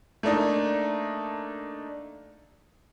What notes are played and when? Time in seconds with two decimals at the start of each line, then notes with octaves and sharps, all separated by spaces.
0.23 A3 A#3 D4 D#4